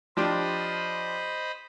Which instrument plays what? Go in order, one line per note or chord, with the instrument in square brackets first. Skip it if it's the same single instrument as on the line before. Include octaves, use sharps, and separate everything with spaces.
[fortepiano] F3 D4 G4 [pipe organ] C5 D#5 B5